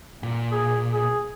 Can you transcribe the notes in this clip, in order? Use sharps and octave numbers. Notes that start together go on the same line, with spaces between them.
A#2
G#4
G#4